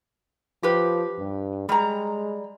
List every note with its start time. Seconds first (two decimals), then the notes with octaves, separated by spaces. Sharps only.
0.63 F3 G4 B4
1.19 G2
1.69 G3 G#3 A#5